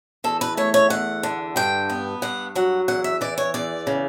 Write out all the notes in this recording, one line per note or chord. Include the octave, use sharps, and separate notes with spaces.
E2 A4
B4
A3 C#5
C#5
E2 F#5
D3
G2 G5
B3
G2 F#5
F#3 F#5
E2 F#5
E5
E3 D5
C#5
E2 D5
C#3